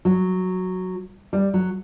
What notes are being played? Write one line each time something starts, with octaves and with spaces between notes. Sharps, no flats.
F#3
G3
F#3